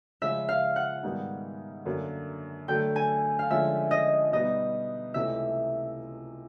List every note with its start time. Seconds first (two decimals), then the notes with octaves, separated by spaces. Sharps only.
0.22 C#3 F3 G#3 C#4 F4 E5
0.49 F5
0.76 F#5
1.03 G#2 D#3 G3 B3 D#4
1.85 F#2 D3 F#3 A#3
2.68 D3 F#3 A3 G5
2.96 G#5
3.39 F5
3.50 D3 F3 G#3 C#4 E5
3.91 D#5
4.32 B2 G3 B3 D#4 D#5
5.14 C#2 C3 E3 A3 C#4 E5